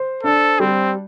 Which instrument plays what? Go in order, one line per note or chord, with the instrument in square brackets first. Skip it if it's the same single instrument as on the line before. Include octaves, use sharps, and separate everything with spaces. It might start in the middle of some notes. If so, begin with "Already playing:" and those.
Already playing: [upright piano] C5
[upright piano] D4 [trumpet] A4
[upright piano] G3 [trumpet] C4